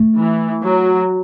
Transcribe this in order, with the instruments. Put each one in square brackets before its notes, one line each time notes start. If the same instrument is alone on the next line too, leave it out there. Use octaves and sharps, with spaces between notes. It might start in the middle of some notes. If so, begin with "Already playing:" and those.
Already playing: [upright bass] A3
[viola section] E3
F#3